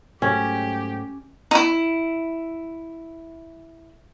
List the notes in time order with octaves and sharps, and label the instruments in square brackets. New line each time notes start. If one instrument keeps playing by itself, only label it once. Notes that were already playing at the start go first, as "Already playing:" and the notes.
[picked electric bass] G#2 F#3 A3 [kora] C#4 [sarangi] G4
[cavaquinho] D#4 E4